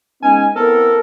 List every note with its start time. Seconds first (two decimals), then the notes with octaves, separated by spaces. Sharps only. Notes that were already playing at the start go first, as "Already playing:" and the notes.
0.22 G#3 B3 C#4 D#4 G#5
0.56 B3 C4 E4 A4 A#4